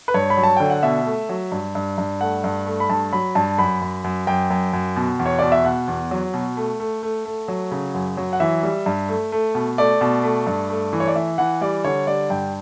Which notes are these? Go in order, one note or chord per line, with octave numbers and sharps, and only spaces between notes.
B4
G2 C#5
B5
F#3
A5
D3 G5
F#5
B2 E5
A3
F#3
G2
G2
G2
A3 F#5
G2
A3
B5
G2 A5
F#3 B5
G2 A5
F#2 B5
F#2
F#2
F#2 G5
F#2
F#2
B2
E2
C#5
B2 D5
E5
B2 F#5
E2
F#3
B2
A3
A3
A3
A3
F#3
C#3
F#2
F#3
F#5
E3 E5
G3
G2
A3
A3
B2
A3 D5
B2
A3
G2
A3
E3
C#5
D5
E3 E5
E3 F#5
G3 D5
D3 C#5
G3 D5
G2 G5